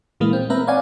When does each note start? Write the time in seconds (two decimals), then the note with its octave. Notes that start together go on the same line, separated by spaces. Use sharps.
0.20 A#2 E3 G#3 A#3
0.33 C4
0.50 A#3 C4 B4 E5 A#5
0.67 C#5 D5 F5 F#5 G#5